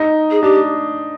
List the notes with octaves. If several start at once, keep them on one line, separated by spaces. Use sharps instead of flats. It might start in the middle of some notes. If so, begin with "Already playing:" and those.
Already playing: D#4
G#4
D4 G4